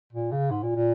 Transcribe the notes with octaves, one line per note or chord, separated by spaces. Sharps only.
A#2
C#3
G#2
A#2
A#2